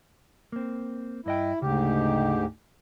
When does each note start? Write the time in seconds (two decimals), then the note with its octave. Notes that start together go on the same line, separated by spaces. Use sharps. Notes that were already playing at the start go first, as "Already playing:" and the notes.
0.52 A#3 C4
1.26 G2 E4 D#5 G5
1.62 D2 G#2 C#3 G4